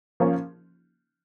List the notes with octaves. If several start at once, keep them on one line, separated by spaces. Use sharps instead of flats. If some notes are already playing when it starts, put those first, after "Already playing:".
F3 A#3 C#4